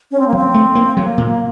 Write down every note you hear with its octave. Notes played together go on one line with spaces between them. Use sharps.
C#4
C4
A#3
F#3
C4
A3
A#3
F#3 A#3
A#2